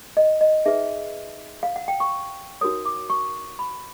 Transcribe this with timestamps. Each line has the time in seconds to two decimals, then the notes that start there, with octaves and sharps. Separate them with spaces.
0.17 D#5
0.41 D#5
0.66 D#4 G#4 B4 E5
1.63 F5
1.76 F#5
1.88 G5
2.00 C#6
2.61 D#4 F#4 A#4 C#5 D#6
2.86 D6
3.10 C#6
3.59 B5